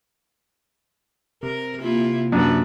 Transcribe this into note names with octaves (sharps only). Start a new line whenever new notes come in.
C3 A#4
C3 A#3 E4 F4
F#2 A#3 D4 F#4 B4